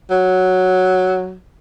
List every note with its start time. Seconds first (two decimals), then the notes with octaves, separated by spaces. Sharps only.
0.10 F#3